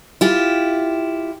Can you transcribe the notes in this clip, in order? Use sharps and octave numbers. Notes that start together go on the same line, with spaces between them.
E4 F4 G4